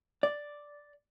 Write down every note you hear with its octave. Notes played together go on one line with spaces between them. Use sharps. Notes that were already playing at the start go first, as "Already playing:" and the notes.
D5